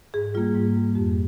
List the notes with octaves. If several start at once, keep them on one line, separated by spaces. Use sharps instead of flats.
G#2 G#4
G3 A#3 F4
G#2
G3 A#3
F2 G4